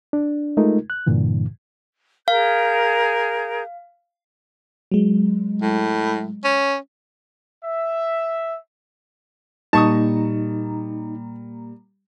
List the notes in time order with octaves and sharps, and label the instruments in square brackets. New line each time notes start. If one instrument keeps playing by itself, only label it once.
[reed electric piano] D4
G#3 A3 D#4 F4 A#4
F#6
G2 A#2 D3 E3
[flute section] G#4 A#4 G6 [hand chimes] F5
[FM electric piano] F#3 G#3
[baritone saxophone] A2
C#4
[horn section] E5
[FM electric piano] A#2 A#3 A#5 [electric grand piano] G3 [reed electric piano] D#4 [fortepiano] A5 C#6 D#6